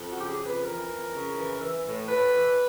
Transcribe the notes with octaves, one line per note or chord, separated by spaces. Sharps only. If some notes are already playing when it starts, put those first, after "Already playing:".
Already playing: F2
F#4
C#3 G4
G#4
F2
B4
E3 A#4
F2
C#3
E3
E3
A2
A2 B4
E3